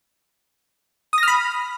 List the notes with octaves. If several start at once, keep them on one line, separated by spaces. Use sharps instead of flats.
B5 D#6 F6 A#6